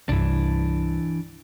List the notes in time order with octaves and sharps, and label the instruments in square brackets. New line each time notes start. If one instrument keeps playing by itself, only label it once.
[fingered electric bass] C2 G2 [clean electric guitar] E3 D4